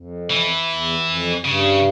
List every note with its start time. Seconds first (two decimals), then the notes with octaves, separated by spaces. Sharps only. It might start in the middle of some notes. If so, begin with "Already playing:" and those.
Already playing: F2
0.31 E3
0.69 E2
1.06 F2
1.44 G2 C#3